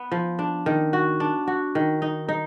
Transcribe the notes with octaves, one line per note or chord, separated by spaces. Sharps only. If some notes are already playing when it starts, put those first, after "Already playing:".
Already playing: B3
F3
D4
D#3
F#4
D4
F#4
D#3
D#4
D#4